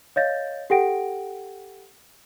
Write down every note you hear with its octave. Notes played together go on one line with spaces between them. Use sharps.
C#5 D#5 F5 G6 A6 A#6
G4 A4 F#5 G5 A#6 D7